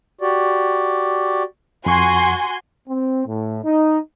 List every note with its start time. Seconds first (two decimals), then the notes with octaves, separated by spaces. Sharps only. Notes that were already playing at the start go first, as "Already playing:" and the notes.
0.21 F#4 G4 D5
1.86 F2 F#4 G#5 C6 C#6
2.88 C4
3.27 A2
3.64 D#4